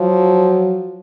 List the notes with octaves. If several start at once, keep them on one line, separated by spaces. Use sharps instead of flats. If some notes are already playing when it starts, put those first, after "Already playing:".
Already playing: F3 F#3